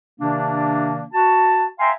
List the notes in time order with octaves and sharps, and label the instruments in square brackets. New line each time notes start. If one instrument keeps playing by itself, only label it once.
[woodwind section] C3 D#3 A#3 D4
F#4 A5
E5 F5 G5 G#5 A#5 C6